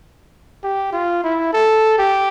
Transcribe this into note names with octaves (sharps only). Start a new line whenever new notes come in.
G4
F4
E4
A4
G4